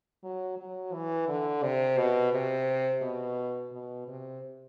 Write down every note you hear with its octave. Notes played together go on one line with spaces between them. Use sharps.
F#3
F#3
E3
D3
C3
B2
C3
B2
B2
C3